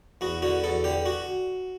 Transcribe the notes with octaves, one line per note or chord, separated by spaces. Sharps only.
E2 F#4
D3 F#4
E2 A4
D3 G4
F#4